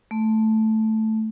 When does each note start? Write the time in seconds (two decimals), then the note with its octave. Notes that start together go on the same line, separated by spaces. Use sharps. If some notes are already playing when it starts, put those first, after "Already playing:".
0.11 A3